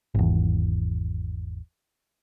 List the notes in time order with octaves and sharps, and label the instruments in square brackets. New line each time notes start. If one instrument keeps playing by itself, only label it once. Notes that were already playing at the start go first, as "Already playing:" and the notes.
[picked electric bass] G#1 E2